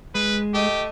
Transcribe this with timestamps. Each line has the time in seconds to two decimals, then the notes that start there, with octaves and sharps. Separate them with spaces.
0.15 G#3 B4
0.54 A3 G4 D#5